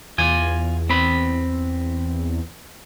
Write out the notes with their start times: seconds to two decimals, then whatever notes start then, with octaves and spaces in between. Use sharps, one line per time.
0.18 E2 F4 G#5
0.89 C4 B5